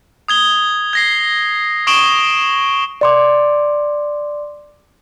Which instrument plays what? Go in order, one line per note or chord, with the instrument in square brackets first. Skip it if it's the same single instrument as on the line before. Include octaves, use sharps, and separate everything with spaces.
[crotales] D#6 G#6 G7
G#6 A#6 C7
C#6 D#6 D7 E7 F#7 G7
[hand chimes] D5 C6 D6